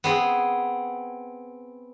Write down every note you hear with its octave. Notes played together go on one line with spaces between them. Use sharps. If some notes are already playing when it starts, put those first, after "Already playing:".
B3 C4 G#4